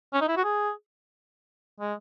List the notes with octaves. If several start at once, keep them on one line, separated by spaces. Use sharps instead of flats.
C#4
D#4
E4
F#4
G#4
G#3